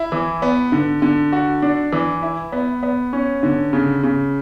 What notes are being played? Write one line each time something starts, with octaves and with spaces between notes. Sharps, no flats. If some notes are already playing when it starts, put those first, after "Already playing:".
Already playing: E4
E3
B3
D3
D3
F#4
D4
E3
E4
B3
B3
C#4
D3
C#3
C#3